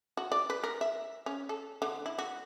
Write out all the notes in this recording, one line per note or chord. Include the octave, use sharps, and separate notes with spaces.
F#4
D5
B4
A#4
E5
C#4
A4
D3
E4
F#4